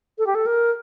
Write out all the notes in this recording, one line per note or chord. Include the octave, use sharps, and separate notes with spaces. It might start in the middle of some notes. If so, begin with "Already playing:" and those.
A4
G4
A4
A#4